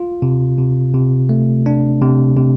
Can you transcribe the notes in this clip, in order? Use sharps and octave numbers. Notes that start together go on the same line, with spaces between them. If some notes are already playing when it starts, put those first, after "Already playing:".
Already playing: F4
C3
C3
C3
A3
D4
C3
C3